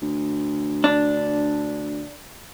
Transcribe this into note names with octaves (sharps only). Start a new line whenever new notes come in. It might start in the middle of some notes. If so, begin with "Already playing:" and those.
D2
D4